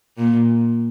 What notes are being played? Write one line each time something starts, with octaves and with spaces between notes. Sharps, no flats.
A#2